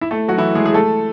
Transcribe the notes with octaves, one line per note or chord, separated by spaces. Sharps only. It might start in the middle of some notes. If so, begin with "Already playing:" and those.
E4 E5
A3 A4
F#3 F#4
E3 E4
G#3 G#4
G#4
A3 A4